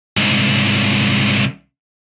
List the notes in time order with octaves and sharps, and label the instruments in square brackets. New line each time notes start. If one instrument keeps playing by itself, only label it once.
[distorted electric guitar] C2 G#2